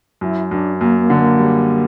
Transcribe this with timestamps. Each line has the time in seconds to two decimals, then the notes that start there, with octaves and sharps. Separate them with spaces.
0.21 F#2 E4
0.51 F#2 D4
0.80 F#2 A#3
1.00 A#3
1.10 D3
1.19 A#3
1.39 G3